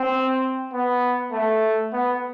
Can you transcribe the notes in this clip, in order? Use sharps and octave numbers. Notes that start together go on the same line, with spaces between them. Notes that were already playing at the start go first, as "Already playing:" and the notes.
Already playing: C4
B3
A3
B3